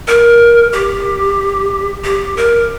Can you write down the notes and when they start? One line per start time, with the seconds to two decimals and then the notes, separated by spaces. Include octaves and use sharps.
0.08 A#4
0.73 G4
2.04 G4
2.37 A#4